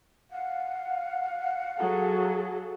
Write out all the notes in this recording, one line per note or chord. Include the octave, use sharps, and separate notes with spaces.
F5 F#5
F#3 G#4 A4